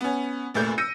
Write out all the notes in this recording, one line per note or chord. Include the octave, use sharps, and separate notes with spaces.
B3 C#4
F1 D2 A#2 A3 G6
E6 G6 A#6 C#7 D#7